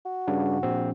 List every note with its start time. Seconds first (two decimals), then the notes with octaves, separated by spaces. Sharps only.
0.06 F#4
0.27 G2 C#3 D4
0.63 A#1 C4